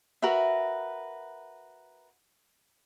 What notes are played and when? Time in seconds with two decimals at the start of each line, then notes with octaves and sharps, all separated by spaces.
0.22 F#4 A#4 B4 E5